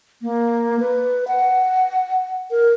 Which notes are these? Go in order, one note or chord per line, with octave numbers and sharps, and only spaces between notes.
A#3
B4
F#5
A#4